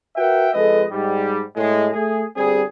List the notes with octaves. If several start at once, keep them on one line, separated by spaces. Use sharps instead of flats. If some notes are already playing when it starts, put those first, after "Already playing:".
F#4 A#4 B4 E5 F#5 G5
F2 G#3 A4 B4 D#5
G#2 G3
A2 G#3
A3 G#4
G1 G3 C4 G#4